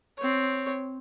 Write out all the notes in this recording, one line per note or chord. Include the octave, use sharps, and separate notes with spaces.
C4 C#5